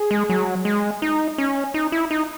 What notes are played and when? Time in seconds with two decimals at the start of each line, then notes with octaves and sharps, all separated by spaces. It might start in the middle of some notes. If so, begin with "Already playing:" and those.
Already playing: G#4
0.11 G#3
0.29 F#3
0.65 G#3
1.02 D#4
1.38 C#4
1.74 D#4
1.92 E4
2.11 D#4